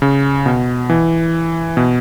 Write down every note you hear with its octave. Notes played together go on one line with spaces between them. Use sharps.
C#3
B2
E3
B2